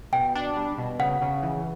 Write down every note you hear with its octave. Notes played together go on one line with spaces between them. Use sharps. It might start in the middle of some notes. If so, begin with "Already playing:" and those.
B2 G5
D4
G3
B2
C#3 F#5
C#3
E3